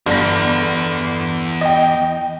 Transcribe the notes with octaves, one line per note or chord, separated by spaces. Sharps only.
G1 E2 A#6
D#5 G5